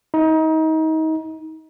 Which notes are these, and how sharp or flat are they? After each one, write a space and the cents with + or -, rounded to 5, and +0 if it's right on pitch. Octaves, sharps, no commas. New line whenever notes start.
D#4 +30